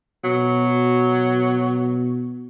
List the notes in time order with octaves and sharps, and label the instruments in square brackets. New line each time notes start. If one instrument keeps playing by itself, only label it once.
[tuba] B2 [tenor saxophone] F#3